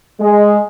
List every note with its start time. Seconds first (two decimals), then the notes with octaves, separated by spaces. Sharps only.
0.20 G#3